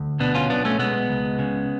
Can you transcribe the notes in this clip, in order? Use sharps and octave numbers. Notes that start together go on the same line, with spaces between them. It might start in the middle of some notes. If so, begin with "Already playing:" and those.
Already playing: D2
B2 B3 D4
C#4 F4
B1 B3 D4
A3 C#4
B2 G#3 B3
C#2
C#3